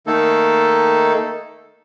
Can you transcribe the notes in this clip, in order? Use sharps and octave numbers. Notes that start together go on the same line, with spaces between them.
D#3 A3 A#3 D#4 A4